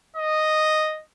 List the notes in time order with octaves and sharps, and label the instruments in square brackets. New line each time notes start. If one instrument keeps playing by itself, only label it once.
[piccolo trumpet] D#5